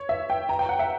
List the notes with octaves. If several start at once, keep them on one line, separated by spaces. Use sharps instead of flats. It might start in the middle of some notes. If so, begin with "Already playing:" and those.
Already playing: C#5
E5
G5
A#5
G5
F#5
E5